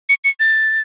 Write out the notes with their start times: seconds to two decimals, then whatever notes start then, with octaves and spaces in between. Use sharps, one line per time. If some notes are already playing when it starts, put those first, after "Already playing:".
0.09 C#7
0.24 C#7
0.40 A6